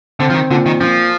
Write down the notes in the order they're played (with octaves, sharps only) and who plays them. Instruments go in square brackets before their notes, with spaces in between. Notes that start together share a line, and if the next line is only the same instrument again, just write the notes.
[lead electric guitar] D3 [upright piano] C4
[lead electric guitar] F3
D#3
[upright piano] A#2 [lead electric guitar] D3
[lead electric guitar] D#3
[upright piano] A#2 [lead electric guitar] F3